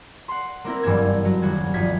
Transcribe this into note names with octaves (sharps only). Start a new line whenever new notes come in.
F#5 C6
A#3 C4 E4 A#4
F#1 G2 E3 A#3 E6 G#6
F#3
D#1 F#4 G#6
G1 F3 D#4 G#6 B6